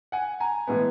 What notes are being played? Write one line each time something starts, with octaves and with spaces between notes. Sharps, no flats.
F#5 G#5
G#5 A#5
A2 E3 G#3 B3